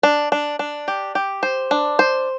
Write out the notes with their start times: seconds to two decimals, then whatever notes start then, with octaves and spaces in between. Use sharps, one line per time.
0.03 D4
0.32 D4
0.59 D4
0.88 G4
1.15 G4
1.43 C5
1.71 D4
1.99 C5